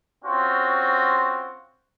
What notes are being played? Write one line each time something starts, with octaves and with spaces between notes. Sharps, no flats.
C4 C#4 F4 F#4 C5